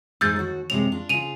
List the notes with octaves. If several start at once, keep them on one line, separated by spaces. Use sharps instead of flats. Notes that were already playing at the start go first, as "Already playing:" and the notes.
G#2 G#3 D#4 E6 G6 A6
D#2 F#4
F#2 C3 G#3 F7
D4 F4
C#3 F4 D#7 F7